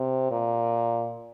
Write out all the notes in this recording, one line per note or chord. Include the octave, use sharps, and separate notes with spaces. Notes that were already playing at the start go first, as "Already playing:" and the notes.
Already playing: C3
A#2